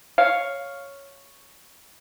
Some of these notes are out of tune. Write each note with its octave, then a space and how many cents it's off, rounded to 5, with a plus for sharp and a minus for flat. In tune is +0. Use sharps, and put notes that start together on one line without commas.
C#5 +0 F5 +0